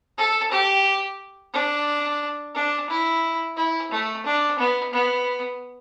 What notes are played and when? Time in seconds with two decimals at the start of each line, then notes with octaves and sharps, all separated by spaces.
0.18 A4
0.51 G4
1.53 D4
2.55 D4
2.90 E4
3.56 E4
3.91 A3
4.26 D4
4.58 B3
4.93 B3